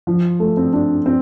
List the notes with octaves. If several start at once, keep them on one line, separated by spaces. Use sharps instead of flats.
F3
A3
C4
D4
C4